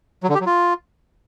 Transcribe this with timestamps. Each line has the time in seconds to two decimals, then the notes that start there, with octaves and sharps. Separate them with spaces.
0.23 F#3
0.29 D3
0.35 G4
0.41 F#3
0.46 F4